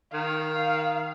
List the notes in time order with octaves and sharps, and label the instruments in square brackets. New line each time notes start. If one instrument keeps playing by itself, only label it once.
[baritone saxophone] D#3 [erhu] F5